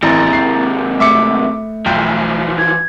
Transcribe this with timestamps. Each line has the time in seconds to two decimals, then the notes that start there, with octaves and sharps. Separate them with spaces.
0.03 A1 D#2 C3 E4 A#5 A6
0.33 C7
1.00 A3 E5 D6 C#7
1.86 B1 E3 F3 G5
2.59 G#6